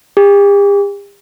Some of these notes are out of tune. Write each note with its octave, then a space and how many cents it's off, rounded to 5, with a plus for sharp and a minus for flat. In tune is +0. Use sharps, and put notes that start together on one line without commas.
G4 +45